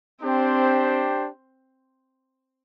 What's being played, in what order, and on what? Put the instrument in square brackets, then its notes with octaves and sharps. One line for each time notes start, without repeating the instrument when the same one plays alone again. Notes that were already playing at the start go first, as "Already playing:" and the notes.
[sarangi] C4 [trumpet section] D4 G4 C5 G5